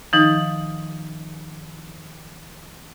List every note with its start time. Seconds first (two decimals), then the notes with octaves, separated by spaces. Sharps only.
0.13 D#3 F3 D#4